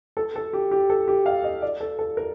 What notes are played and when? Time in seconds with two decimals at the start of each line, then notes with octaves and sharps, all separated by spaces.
0.17 A4
0.36 A4
0.53 G4
0.71 G4
0.90 A4
1.08 G4
1.26 F5
1.44 D#5
1.62 D5
1.80 A4
1.99 A4
2.17 A#4